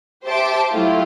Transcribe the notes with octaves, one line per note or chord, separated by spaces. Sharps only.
G4 C5 E5 A5 D6
F#3 A3 E4 F4 G4